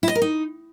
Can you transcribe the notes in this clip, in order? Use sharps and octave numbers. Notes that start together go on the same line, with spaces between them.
E4
D#5
A#4
D#4